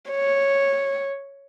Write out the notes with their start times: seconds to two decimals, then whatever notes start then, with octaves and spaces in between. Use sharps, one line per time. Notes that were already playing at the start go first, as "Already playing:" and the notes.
0.11 C#5